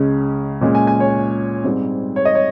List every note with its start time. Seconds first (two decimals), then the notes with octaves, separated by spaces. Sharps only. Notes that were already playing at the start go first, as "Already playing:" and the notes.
Already playing: C#2 C#3 G#3 C#4
0.61 A#2 G#3 C#4
0.75 G#5
0.87 G#5
1.00 C#5
1.64 G#2 G3 C4
2.16 C#5
2.25 D#5
2.35 C#5